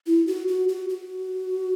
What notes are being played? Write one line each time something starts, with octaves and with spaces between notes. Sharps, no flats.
E4
F#4
F#4
F#4
F#4